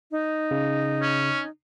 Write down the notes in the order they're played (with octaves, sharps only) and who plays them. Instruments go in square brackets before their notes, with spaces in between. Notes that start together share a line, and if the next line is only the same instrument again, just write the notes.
[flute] D#4
[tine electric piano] C#3
[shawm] C#4